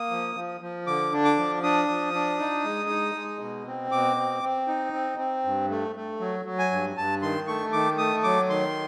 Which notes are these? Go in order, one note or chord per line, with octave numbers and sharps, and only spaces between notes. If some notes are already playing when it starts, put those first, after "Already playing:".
Already playing: A#3 D#6
F3
F3
F3
D3 D6
D4
D6
F3
D4 D#6
F3
D4
D#4
G#3
D#4
G#3
B2
C4
B2 D6
C4
C4
D#4
C4
C4
G2
A3
A3
F#3
F#3
G#5
G2
G2 A5
D#3 C6
A3 C#6
D#3 D6
A3 D#6
F#3 D6
D#3 C6